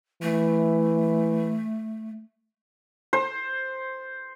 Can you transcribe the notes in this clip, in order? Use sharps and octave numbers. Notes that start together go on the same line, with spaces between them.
E3 A3
C5